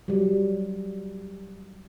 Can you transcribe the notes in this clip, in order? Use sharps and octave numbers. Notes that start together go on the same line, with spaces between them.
F#3 G3